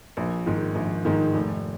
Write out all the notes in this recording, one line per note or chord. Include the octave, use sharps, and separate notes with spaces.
A#1
G#2 D#3
A#1
G#2 D#3
F1